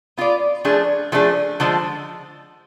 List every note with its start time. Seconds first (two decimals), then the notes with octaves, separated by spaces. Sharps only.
0.17 B3 F4 B4 D5
0.65 F3 A3 D4 G#4
1.12 F3 A3 D4 G#4
1.60 D3 F3 G#3